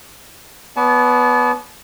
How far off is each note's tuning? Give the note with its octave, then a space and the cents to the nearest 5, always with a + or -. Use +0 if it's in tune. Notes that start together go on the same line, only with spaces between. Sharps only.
B3 +0 D5 -40 A5 -40